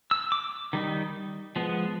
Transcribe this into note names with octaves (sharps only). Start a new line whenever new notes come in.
E6
D6
D#3 G3 D#4
F3 G#3 B3